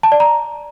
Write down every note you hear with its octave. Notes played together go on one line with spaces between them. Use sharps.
A5
D5
A#5